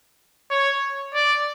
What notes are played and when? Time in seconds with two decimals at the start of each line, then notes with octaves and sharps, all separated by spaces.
0.51 C#5
1.14 D5